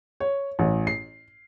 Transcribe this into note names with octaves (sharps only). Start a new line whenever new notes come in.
C#5
A1
C7